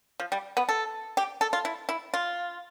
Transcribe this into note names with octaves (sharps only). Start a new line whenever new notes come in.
F3
G3
B3
A4
G4
A4
F4
E4
E4
F4